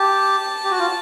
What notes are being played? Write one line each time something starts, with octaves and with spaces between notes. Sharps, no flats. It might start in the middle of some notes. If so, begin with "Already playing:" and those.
Already playing: G4 A5
G4
F#4
F4